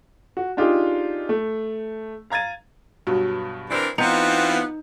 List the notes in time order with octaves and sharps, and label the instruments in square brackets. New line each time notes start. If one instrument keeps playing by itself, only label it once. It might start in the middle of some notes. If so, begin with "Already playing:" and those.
[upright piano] F#4
D4 D#4 F4 G4 G#4
A3
F5 A#5 G#6 A6 D#7
G2 B2 F#3
[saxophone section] E3 C4 D4 [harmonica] A#4
[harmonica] E3 C4 F4 [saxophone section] B3 [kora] D#4 [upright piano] G6 C#7 F7